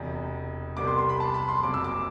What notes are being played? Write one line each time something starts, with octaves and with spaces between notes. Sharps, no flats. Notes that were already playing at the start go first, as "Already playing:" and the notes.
Already playing: E1 E2 C3
C2 C3 G3 B3 D6
C6
C6
B5
A5
B5
C6
F#1 F#2 F#3 C4 D6
E6
D6